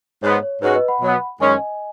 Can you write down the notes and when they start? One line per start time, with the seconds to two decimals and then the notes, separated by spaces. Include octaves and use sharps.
0.23 G#2 G#3 B3 C#5
0.43 C#5
0.62 G#2 G#3 C#4 F#4 B4
0.75 B4 D#5
0.88 F#5 B5
1.01 B2 F#3 B3
1.40 F#2 D#3 G#3 C#4 D#5 G#5